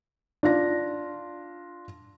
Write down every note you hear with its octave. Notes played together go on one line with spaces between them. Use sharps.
D4 F4 A#6